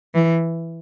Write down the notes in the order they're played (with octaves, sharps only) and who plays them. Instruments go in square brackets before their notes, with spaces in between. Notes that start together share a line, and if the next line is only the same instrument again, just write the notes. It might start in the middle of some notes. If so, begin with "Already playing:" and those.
[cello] E3